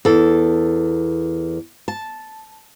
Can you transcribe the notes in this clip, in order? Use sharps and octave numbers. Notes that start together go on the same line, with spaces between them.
E2 A4
A5